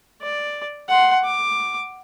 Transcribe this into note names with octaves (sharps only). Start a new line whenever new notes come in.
D5
F#5 C6
D6